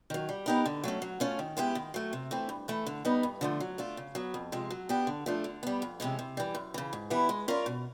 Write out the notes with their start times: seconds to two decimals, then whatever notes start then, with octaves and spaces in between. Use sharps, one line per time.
0.10 D#3 F#3
0.29 G3
0.46 B3 D#4 G4 A#4
0.66 D3
0.84 F#3 A3 C#4
1.02 F#3
1.20 A3 C#4 F4
1.39 D#3
1.57 G#3 B3 E4 G4
1.75 D#3
1.94 F#3 A3
2.13 C3
2.31 E3 A3 C4
2.49 G2
2.68 E3 A3
2.86 D3
3.05 G3 B3 D#4
3.23 G2
3.41 D3 F3 A3
3.60 F#3
3.78 A3 D4 F4
3.97 C#3
4.15 F#3 B3
4.34 F2
4.52 C3 F3 G#3
4.70 F#3
4.89 B3 D4 G4
5.07 D3
5.26 F3 A3 D4
5.44 D3
5.63 G3 B3
5.82 F2
6.00 C3 E3 G#3 C#4
6.19 C3
6.37 E3 G3
6.55 F#2
6.74 C#3 E3
6.93 G#2
7.10 E3 G3 B3 E4
7.29 G#3
7.48 C#4 F4 A#4 D5
7.66 B2